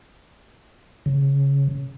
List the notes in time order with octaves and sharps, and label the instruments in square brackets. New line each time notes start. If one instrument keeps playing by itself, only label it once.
[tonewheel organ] C#3